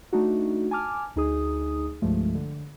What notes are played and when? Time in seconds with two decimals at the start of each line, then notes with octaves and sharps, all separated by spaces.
0.13 A3 D4 D#4 F#4
0.71 G#5 A5 D6 F6
1.16 D2 D#4 G#4 D#6
2.02 C2 G2 F3 G#3 A3
2.35 D3